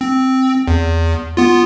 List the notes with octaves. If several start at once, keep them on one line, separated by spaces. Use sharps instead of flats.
C4
E2
B3 F4